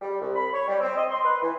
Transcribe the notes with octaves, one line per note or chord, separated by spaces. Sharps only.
G3
C2
B5
C#5
G3
C4
D#5
C6
B4
E3